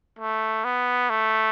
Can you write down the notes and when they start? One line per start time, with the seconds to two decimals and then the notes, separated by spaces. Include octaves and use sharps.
0.19 A3
0.65 B3
1.10 A3